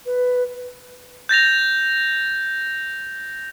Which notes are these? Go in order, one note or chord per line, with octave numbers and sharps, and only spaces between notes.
B4
G6 A6 A#6 F7